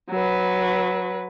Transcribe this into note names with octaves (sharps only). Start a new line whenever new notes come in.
F#3 B4